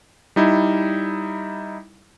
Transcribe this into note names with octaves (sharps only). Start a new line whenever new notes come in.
G3 D#4 E4